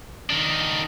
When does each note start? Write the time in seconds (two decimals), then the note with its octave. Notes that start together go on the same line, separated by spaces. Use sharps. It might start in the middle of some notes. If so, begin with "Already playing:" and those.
0.30 D#3 D4